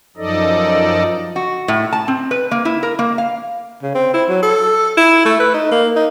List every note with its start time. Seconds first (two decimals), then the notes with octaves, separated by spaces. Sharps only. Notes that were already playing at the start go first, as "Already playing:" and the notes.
0.17 F#2 F3 D#4 A4 D5 D#5
1.36 F#4
1.68 A2
1.93 A5
2.08 C4
2.31 B4
2.51 A#3
2.65 E4
2.83 A#4
2.99 A#3
3.18 F5
3.83 C#3
3.95 C4
4.14 E4
4.29 F#3
4.42 A4
4.97 E4
5.25 A3
5.40 B4
5.54 D#4
5.71 A#3
5.96 D#4